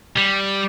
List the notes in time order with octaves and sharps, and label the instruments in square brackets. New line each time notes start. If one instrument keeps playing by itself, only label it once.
[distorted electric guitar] G3